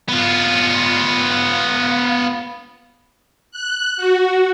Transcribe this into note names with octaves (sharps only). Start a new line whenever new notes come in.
B3 F4
F#6
F#4